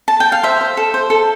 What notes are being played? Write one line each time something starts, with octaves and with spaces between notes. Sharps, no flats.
A5
G5
F5
C5 E5
C5
A4
C5
A4